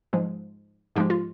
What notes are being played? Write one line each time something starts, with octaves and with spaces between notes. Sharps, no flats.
G#2 F3 G#3
G#2 F3 G#3 G4
F4